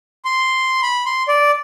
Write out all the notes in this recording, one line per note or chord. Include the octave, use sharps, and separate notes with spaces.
C6
B5
C6
D5